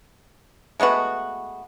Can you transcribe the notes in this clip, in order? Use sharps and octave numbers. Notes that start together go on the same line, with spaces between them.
G#3 A3 B3 F#4